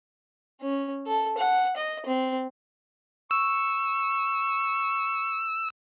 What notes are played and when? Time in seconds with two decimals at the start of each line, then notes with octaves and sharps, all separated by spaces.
0.62 C#4
1.06 A4
1.37 F#5
1.76 D#5
2.06 C4
3.31 C#6 E6